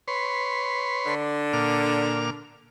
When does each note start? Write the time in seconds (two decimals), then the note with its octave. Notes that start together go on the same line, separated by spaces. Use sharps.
0.08 B4 C#5 C6
1.06 D3 D4
1.53 A#2 D6 F6